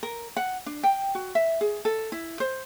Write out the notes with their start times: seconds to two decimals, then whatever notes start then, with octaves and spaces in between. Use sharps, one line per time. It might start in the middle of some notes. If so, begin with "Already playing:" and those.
0.03 A#4
0.37 F#5
0.66 D4
0.83 G5
1.15 F#4
1.35 E5
1.61 G#4
1.85 A4
2.12 E4
2.40 C5